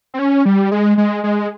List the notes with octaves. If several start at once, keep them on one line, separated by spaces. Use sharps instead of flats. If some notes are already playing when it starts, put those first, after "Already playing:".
C4
C#4
G3
G#3
G#3
G#3